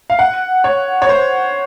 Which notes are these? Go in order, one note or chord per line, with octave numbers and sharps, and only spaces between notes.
F5
F#5
C#5
C#5
C5